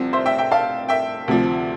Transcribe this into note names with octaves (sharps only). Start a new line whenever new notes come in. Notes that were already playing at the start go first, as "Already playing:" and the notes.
Already playing: C2 C3 F3 C4
C5 E5
E5 G5
E5 G5
F5 A5
E5 G5
D2 C3 F3